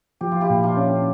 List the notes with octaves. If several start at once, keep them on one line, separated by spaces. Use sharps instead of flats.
F3 G4
F4
E4 G4
A#2
D4 F4
C#4